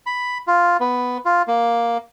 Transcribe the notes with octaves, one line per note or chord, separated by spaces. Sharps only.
B5
F4
B3
F4
A#3